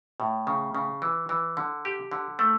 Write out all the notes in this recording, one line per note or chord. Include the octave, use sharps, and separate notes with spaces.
A2
C#3
C#3
E3
E3
D3
G4
D3
A3